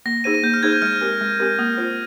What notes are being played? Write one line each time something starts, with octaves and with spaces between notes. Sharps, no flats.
A#3 A#6
D#4 G#4 C5 D#7
D#7
A#3 G6
F6
D#4 G#4 C5 G#6
G6
G#3 F6
C4 G4 A#4
G#3
C4 G4 A#4
A#3 D#6
F4 C5